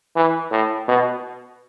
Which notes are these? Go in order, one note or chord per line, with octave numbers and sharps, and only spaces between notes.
E3
A2
B2